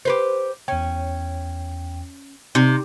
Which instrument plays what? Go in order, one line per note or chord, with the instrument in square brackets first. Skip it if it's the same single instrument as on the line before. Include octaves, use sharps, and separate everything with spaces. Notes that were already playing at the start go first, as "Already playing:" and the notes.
[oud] G4 B4 C5
[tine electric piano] E2 G5 [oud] C#4
[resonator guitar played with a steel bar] C3 [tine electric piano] D#4